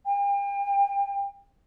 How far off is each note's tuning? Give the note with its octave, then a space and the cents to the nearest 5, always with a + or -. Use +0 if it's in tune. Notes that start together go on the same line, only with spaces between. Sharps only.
G5 +40